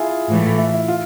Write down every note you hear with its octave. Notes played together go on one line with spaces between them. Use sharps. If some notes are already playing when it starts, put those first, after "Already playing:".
Already playing: E4 F4 G#4
A2 E3 A3
E4
E4
F4